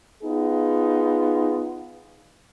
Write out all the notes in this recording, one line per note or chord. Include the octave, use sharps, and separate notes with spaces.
B3 D#4 F4 G#4